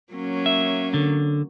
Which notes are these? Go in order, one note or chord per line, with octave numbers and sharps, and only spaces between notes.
F#3 A#3 C#4
E5
D3